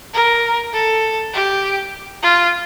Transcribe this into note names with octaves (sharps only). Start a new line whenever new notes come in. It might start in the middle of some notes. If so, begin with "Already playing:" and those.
A#4
A4
G4
F4